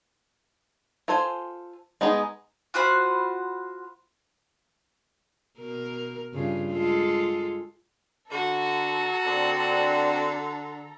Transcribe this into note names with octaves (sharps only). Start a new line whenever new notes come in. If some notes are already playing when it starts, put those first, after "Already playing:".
F4 A4 C5 G#5
G#3 B3 D#4 G#4
F4 F#4 C5 B5
B2 A#4
G2 C#3 F4
G#3 F4 A4
D3 F#4 A4 A#5
D3 C4 D4 D5